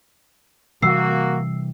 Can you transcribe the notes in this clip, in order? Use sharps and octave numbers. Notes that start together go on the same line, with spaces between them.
C3 E3 G3 A#3 F#4 E6 C7